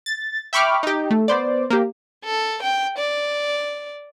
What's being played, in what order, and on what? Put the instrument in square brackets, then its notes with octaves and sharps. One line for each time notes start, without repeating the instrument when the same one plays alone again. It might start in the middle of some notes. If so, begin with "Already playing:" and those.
[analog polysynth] A6
E5 G5 B5 C#6 D6 F6
D#4 G4
A3
B3 C5 D5
A#3 G4
[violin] A4
G5
D5